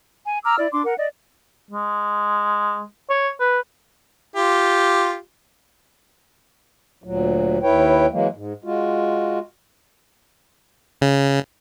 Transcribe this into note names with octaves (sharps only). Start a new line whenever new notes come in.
G#5
A#5 D6 E6 F6
E4 D5
D4 C6 D6
A#4 F#5
D5 D#5
G#3
C#5
B4
F4 G4
D2 A#2 F#3
D#2 E4 B4 C#5 G5
E3 F#3 G#3 A#3
G#2
G#3 F4 F#4
C#3